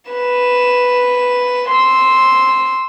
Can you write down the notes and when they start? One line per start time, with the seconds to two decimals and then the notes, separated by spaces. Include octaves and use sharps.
0.11 B4 E7
1.70 C6 E6